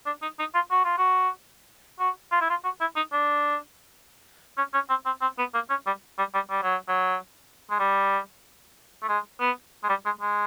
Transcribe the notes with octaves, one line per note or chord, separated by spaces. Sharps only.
D4
D#4
D#4
F4
F#4
F4
F#4
F#4
F4
E4
F4
F#4
E4
D#4
D4
C#4
C#4
C4
C4
C4
B3
A#3
C#4
G3
G3
G3
G3
F#3
F#3
G#3
G3
A3
G#3
B3
G#3
G3
G#3
G#3